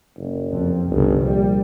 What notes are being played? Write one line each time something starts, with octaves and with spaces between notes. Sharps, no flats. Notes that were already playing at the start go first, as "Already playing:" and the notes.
F#1
F2
G1 C2 C#3
A#1 G3